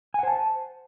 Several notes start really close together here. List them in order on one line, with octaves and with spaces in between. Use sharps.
G#5 F#5 C5 A5